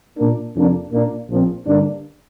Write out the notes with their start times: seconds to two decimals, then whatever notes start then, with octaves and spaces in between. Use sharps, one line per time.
0.18 A#2 A#3 D4
0.55 F2 C3 A#3 D4
0.92 A#2 A#3 D4
1.29 A#1 A#2 F3 C4
1.65 G2 D3 A#3 D4